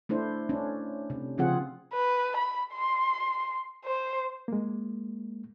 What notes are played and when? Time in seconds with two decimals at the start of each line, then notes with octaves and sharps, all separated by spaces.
0.09 A3 D4 E4 C5
0.49 C#4 D4
1.10 C3
1.38 C#3 F3 C4 F4 G#4 F#5
1.93 B4
2.37 B5
2.73 C6
3.85 C5
4.48 G#3 A#3